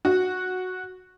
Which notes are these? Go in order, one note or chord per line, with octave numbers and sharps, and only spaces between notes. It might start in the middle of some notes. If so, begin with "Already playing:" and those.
F#4